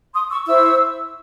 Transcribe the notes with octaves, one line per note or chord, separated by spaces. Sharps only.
C6 D#6
C#6 E6
E4 C5 C#6 E6